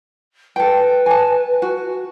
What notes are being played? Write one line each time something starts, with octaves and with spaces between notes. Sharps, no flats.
A4 B4 G5
G#5 A5
F#4